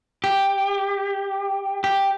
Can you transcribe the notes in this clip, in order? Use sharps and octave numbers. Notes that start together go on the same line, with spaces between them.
G4
G4